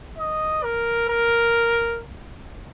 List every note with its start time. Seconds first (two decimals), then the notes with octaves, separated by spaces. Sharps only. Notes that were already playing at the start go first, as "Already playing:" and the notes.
0.18 D#5
0.64 A#4
1.09 A#4